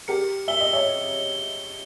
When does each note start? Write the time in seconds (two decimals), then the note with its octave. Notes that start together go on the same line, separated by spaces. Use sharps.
0.08 G4 A#4 C#7
0.48 E5 G7
0.61 D#5
0.73 C#5 E5